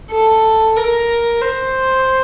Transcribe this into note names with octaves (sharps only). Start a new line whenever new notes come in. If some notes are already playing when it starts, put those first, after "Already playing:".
A4
A#4
C5